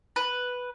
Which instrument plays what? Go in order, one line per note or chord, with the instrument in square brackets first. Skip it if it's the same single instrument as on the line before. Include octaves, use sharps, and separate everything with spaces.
[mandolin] B4